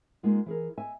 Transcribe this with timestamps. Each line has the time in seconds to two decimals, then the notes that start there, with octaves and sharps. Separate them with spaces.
0.23 G#3 A#3 B3 D#4 F4
0.46 E3 G#4 A#4
0.78 D#5 E5 G#5